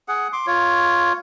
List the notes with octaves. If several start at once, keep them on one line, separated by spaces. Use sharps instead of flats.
G#4 F#5
C6 D6
F4 C#5